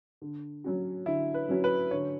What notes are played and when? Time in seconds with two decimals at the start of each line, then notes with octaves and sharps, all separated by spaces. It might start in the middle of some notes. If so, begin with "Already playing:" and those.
0.22 D3
0.64 F#3 C#4 F#4
1.06 D3 E4
1.34 B4
1.49 F#3 C#4 F#4
1.64 B4
1.91 D3 C#5